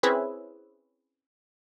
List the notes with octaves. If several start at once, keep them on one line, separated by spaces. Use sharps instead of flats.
C4 C#4 E4 G#4 B4 E5